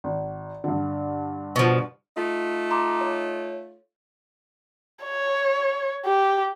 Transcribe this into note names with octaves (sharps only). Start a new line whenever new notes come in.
G#1
G2 D3
B2 F3
A3 D#4 F4
A#5 C6 D6
C#5
C#5
G4